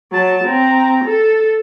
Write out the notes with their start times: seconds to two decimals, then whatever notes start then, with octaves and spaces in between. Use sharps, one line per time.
0.12 F#3 A5
0.44 C4 A#5
1.04 A4